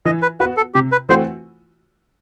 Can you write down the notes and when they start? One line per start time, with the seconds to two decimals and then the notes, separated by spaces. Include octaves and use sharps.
0.05 E3 D#5
0.22 B4
0.40 F#4 B4
0.43 B3
0.57 A4
0.74 C3 G4
0.92 B4
1.09 E3 A3 C4 F#4 C5